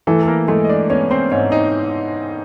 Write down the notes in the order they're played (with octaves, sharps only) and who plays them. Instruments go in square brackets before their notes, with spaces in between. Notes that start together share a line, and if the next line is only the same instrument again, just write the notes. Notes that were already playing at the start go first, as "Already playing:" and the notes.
[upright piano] E3 [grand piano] A3 A4
[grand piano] A4
A#3 A#4
[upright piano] G#3 [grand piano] A3 A4
[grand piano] D#5
D4 D5
[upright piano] B3 [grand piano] C#4 C#5
[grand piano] C4 C5
[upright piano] G#2 [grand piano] C#4 C#5
[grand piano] D#4 D#5